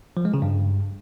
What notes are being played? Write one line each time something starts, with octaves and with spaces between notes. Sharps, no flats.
F3
G#3
C#3
G2